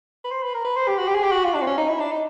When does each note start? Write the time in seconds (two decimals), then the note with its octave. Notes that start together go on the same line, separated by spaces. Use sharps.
0.24 B4
0.31 C5
0.43 B4
0.54 A#4
0.65 B4
0.76 C5
0.88 G4
0.98 F#4
1.08 G4
1.15 G#4
1.23 G4
1.32 F#4
1.44 F4
1.54 D4
1.62 C4
1.67 C#4
1.78 D#4
1.88 E4
2.00 D4
2.11 D#4